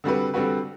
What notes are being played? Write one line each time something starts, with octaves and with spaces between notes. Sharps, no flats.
D3 G3 C4 F#4 B4
D3 G3 C4 F#4 B4